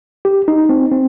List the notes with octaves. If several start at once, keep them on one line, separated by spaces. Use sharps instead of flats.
G4
D#4
C4
C4